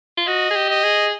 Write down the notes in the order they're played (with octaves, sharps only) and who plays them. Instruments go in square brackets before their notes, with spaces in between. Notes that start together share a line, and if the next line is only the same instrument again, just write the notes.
[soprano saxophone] F4
[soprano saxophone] F#4 [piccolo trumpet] D#5
[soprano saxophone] G#4
G4
[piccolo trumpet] D#5
[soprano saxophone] G#4